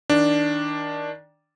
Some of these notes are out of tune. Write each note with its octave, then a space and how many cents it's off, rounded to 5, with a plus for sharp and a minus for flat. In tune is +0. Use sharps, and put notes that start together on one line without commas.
D#3 +15 D4 +0